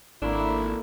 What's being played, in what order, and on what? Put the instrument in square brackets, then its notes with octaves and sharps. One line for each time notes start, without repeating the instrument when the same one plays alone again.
[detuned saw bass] G#1 [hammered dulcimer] A3 A#3 [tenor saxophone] D4 [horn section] E4